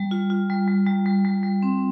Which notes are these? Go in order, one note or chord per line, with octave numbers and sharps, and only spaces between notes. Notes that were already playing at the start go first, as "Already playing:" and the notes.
Already playing: G3
F4
F4
G3
G3
G3
G3
G3
G3
C4